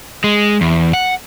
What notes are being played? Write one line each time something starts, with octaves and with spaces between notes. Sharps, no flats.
G#3
E2
F#5